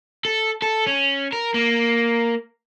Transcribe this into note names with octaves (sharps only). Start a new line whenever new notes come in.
A4
A4
C#4
A#4
A#3